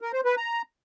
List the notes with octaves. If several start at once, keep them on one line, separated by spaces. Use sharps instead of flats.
A#4
C5
B4
A#5